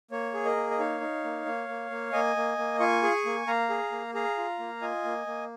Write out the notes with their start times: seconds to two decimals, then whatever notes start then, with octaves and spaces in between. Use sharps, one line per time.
0.11 A#3 C#5
0.34 G#4
0.45 A#4 D#5
0.56 A#3
0.71 D#5
0.79 D#4 C#5 F5
1.01 D#4
1.24 A#3
1.46 A#3
1.69 A#3
1.90 A#3
2.13 A#3 D#5 G#5
2.36 A#3
2.58 A#3
2.80 F4 G#5 C#6
3.03 G#4
3.25 A#3
3.47 A#3 F5 A#5
3.70 G#4
3.92 A#3
4.14 G#4 F5 A#5
4.37 F4
4.59 A#3
4.81 F4 D#5 G#5
5.04 A#3
5.26 A#3